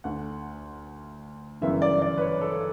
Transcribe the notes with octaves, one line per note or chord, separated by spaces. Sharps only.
D2 D3 F#5
G1 F#2 C#3 E3 E5
D5
D5
B4
C#5
A4